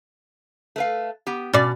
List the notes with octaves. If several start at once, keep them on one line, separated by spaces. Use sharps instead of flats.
A3 B4 F5
B3 G4
B2 C#4 D5